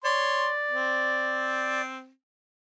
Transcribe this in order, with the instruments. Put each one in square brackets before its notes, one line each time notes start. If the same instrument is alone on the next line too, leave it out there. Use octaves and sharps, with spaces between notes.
[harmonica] C#5 C6 [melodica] D5
[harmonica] C4